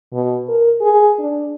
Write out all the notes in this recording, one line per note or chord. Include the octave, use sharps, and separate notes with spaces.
B2
A#4
G#4
D4